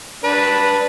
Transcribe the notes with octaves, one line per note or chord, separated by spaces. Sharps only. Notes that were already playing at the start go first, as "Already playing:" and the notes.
D4 B4